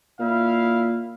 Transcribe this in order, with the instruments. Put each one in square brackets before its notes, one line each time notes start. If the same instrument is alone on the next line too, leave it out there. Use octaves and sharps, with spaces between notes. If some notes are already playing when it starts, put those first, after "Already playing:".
[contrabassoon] A#2 [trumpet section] E4 F5